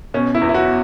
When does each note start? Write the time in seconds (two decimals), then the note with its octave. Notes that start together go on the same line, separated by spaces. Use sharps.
0.14 B2 C#4
0.35 E4
0.41 E2
0.49 E4
0.54 F#4